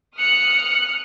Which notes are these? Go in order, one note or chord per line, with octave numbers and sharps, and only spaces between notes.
D#6 F6 F#6 C#7